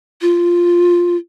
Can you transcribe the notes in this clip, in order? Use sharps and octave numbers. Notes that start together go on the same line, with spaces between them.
F4